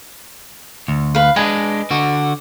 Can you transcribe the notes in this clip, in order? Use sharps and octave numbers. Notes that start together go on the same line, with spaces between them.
D2
B4 F5
G#3 D4 B4 D#5 G#5
D3 F#4